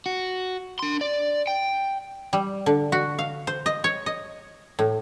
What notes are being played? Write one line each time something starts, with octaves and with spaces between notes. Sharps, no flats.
F#4
D4 C6
D5
G5
G3
D3
F#4
F5
C5
D#5
C#5
D#5
A2